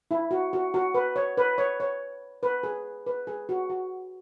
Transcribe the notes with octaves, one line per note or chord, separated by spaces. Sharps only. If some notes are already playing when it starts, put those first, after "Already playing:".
E4
F#4
F#4
F#4
B4
C#5
B4
C#5
C#5
B4
G#4
B4
G#4
F#4
F#4